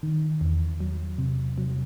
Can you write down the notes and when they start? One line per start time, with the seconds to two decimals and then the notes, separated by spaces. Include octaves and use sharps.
0.03 D#3
0.41 E2
0.80 F#3
1.18 C3
1.58 F#3